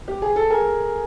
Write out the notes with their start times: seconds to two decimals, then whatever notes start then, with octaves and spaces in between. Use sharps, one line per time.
0.08 G4
0.22 G#4
0.36 A4
0.50 G#4 A#4